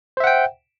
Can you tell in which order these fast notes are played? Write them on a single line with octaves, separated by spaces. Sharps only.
C5 E5 F#5 G5